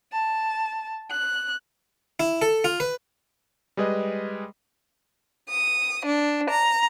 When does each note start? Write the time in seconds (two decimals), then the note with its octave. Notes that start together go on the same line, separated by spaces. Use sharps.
0.12 A5
1.10 F#6
2.20 E4
2.42 A4
2.64 F4
2.80 B4
3.77 G3 G#3 G#4 B4 D#5
5.49 D#6
6.05 D4
6.50 A#5